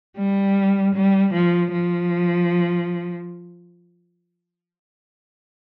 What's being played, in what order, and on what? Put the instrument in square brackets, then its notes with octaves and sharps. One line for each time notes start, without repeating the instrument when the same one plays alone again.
[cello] G3
G3
F3
F3